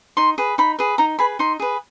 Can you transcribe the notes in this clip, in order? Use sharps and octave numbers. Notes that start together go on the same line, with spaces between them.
D#4 C6
G#4 B4
D#4 B5
G#4 B4
D#4 A#5
G#4 B4 B5
D#4 C6
G#4 B4